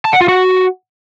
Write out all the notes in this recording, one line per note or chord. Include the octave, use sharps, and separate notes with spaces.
A5
F#5
F4
F#4